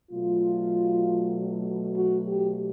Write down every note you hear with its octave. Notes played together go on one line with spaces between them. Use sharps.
B2 F#3 A3 F4
F#4
G4